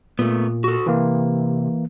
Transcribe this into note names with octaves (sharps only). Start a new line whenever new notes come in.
A#2 A3 B3
F#4 A4
C3 E3 A#3